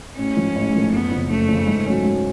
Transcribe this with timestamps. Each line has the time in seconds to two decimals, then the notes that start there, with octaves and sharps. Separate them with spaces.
0.18 A1 C#4
0.37 G#2 F3 A3
0.56 A1
0.74 G#2 F3 A3
0.93 F#1 B3
1.12 F2 C#3
1.30 F#1 A3
1.49 F2 C#3
1.67 G#2
1.86 F#3 C#4
2.05 G#2